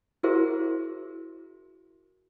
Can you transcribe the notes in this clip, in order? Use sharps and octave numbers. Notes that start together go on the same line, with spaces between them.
E4 F#4 G#4 A#4 C5 E5